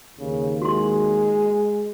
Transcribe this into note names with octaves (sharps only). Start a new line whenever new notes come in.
D#2 C#3
G#3 F#4 C6